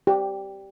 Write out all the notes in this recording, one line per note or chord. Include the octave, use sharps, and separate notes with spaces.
G4